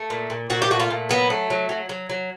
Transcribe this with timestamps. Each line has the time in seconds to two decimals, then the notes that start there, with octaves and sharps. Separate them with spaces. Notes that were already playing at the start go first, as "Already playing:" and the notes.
Already playing: A3
0.10 A#2
0.30 A#2
0.50 A#2 F#4
0.62 G4
0.71 A3 F#4
0.80 F4
0.90 A#2
1.09 F#3 B3
1.30 A3
1.50 F#3
1.69 F#3
1.89 F#3
2.10 F#3